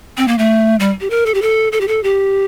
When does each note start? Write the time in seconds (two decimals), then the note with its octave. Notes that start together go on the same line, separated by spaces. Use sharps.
0.18 C4
0.28 A#3
0.39 A3
0.80 G3
1.01 G4
1.10 A#4
1.26 A4
1.34 G4
1.42 A4
1.72 A4
1.81 G4
1.88 A4
2.04 G4